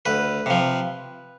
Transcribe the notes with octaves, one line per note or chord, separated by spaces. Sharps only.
D2 B4
C3 F3